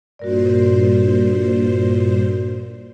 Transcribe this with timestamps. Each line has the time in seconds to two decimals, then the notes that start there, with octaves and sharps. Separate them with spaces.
0.19 G2 A#2 F#4 A#4 C5 D5